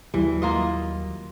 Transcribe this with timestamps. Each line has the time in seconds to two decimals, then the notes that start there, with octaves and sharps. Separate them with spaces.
0.14 D#2 E3 F#3 G3
0.42 A#3 F4 D#5